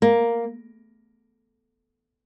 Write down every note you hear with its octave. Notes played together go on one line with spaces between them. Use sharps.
A#3